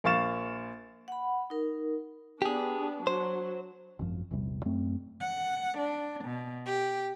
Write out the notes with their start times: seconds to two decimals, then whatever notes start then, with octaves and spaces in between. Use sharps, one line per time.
0.04 A#1 A#3 F5 C#6 A6 E7
1.08 F#5 B5
1.50 D#4 A#4
2.42 B3 D4 G4 G#4
3.07 F#3 C5
3.99 G#1 F#2 F3
4.31 A#1 E2 C3 G3
4.65 F#2 A3 C4
5.21 F#5
5.79 D4
6.25 B2
6.65 G4